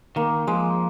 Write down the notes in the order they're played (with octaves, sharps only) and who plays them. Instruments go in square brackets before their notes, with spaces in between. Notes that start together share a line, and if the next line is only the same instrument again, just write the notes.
[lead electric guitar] D#3 [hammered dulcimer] A#3
[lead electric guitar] F3 [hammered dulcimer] G#3